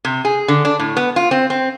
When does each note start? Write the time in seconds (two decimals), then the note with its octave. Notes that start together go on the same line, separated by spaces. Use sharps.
0.05 C3
0.25 G#4
0.48 D3
0.65 D4
0.80 A2
0.97 B3
1.16 F4
1.31 C4
1.50 C4